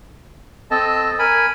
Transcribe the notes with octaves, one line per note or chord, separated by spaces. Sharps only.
C4 A4 D#5 A5
A#4 G#5 B5